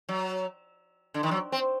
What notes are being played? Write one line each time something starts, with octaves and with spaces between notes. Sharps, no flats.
F#3
D3
D#3
F#3
C4